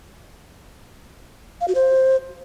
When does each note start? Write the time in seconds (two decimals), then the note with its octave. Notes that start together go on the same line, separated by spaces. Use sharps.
1.61 F5
1.68 F#4
1.75 C5